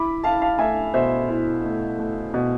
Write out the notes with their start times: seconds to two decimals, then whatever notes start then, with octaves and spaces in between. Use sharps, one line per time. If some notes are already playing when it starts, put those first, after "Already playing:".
Already playing: E4 B5 D6
0.24 E4 F5 A5
0.42 F5 A5
0.58 A3 E5 G#5
0.94 B2 C5 E5
1.28 E4
1.64 A3
1.98 A3
2.34 B2